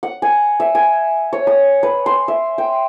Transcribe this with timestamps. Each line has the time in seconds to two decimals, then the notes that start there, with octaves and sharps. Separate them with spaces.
0.03 F#5
0.22 G#5
0.60 E5
0.75 G#5
1.33 C#5
1.47 D#6
1.83 B4
2.06 C6
2.28 E5
2.58 G5